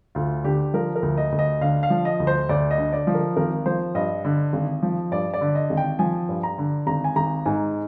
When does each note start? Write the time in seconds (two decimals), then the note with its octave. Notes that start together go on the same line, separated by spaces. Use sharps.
0.15 D2 F4
0.44 D3 G4
0.74 F3 A#4
0.96 A#4
1.03 D2
1.17 D#5
1.32 D2
1.39 D#5
1.61 D3 F5
1.83 F5
1.90 F3
2.05 D#5
2.20 D2
2.27 C5
2.49 D2 D5
2.71 D#5
2.78 D3
2.93 D5
3.07 F3
3.15 A#4
3.36 G#1 A#4
3.66 F3 C5
3.95 G2 D#5
4.24 D3
4.53 G#1
4.83 F3
5.11 G2 D5
5.34 D5
5.41 D3
5.55 D#5
5.70 G#1
5.77 G5
5.99 F3 G#5
6.29 G2
6.43 A#5
6.58 D3
6.87 G#1 A#5
7.04 G#5
7.16 G#1 A#5
7.46 G#2 G#5